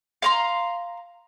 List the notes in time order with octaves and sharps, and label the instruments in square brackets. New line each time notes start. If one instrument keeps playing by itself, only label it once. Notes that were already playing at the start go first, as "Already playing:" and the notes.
[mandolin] F5 A#5 C6